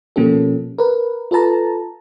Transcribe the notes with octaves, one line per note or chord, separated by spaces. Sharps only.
B2 F3 A#3 C#4 G4 A4
A#4 B4
F4 A4 B4 A5 A#5